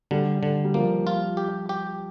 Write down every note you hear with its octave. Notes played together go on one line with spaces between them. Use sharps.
D3 G3
D3
G3
F3 A#3
F4
G4
G4